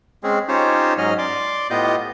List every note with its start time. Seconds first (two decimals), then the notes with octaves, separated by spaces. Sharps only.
0.23 G#3 C4 C#4 G#4
0.48 C#4 D#4 F4 G4 C5 C#5
0.98 G#2 F#3 C#4 D#5 F6
1.18 D5 C6 D6
1.70 A2 B3 F4 G4 D#5 G6